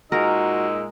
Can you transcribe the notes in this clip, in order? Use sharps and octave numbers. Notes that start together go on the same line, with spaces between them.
A#2 G#3 D#4 F#4 A#4 E6